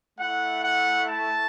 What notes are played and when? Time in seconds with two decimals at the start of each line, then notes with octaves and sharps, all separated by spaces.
0.19 A3 E4 F#5
0.63 F#5
1.08 A5